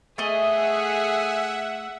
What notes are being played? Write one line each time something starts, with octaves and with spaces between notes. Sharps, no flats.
A3 G#4 D#5 E5 F#5